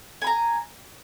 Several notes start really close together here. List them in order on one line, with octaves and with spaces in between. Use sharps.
G#5 B5 A#5